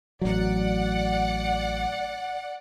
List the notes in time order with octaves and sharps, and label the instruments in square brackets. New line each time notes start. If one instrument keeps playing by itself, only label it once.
[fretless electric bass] A1 F#3 [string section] D5 F#5